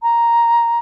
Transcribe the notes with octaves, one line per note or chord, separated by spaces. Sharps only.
A#5